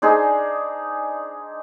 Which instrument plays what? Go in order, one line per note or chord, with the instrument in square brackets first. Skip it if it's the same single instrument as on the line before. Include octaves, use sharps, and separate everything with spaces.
[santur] D4 D#4 G#4 C5